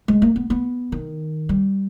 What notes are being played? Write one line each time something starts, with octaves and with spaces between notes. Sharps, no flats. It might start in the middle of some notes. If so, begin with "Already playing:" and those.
G#3
A#3
B3
B3
D#3
G3